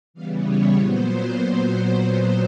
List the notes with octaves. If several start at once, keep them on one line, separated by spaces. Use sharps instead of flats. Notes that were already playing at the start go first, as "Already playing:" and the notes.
C#3 E3 G3 B3 F5
C#5
A#2 F#3 B3 C5